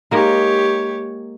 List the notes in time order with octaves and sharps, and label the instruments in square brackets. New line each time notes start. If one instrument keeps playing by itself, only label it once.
[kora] G#3 A#3 D#4 [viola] G4 C#5